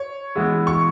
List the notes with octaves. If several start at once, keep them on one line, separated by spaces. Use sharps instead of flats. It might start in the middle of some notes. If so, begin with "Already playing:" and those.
Already playing: C#5
E3 G#3 B3 E4
C#6